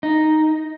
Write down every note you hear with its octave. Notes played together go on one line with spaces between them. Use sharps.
D#4